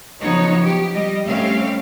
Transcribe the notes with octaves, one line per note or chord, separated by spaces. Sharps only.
C#3 F3 F#3 B3 D#4 C#5
G4
G3 D#5
G3 A3 C4 C#4 G4 F5